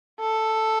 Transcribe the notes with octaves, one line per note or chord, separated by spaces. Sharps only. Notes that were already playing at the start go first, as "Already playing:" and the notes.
A4